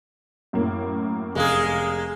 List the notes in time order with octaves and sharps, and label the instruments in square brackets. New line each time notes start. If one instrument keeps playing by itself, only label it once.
[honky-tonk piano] F#2 A2 A#3
[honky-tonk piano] F1 [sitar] G#3 A#3 G#4